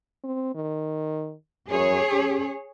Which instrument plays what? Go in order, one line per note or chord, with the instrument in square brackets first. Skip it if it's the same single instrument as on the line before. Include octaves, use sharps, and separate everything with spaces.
[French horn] C4
D#3
[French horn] F#2 [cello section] G#4 C#5
[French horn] C#4